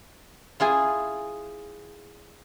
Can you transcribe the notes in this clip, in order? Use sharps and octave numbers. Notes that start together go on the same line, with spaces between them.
E4 F4 G#4 G#5